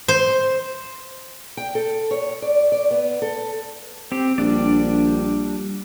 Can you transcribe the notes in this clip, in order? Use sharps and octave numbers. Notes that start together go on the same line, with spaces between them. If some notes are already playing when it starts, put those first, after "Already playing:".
C5
G5
A4
C#5
D5
D5
B3
A4
C4 G4
A#1 G3 D4 D5